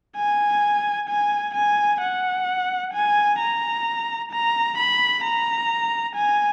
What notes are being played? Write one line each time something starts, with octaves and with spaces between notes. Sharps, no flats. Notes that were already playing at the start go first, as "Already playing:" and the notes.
G#5
G#5
G#5
F#5
G#5
A#5
A#5
B5
A#5
G#5